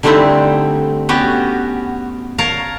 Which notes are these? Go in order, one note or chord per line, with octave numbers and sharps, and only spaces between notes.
D3 G3 A3 C4 D#4 E4
B3 C#4 F#4 G4
A#4 C#5 F5 A5 A#5